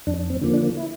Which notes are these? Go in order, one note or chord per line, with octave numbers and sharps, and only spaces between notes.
F2 D4
C4
D3 F3 A#3
D4
E4